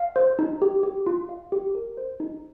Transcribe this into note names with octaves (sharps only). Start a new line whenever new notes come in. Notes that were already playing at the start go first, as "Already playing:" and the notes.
Already playing: F5
C5
D#4
G4
G4
F4
F5
G4
A#4
C5
D#4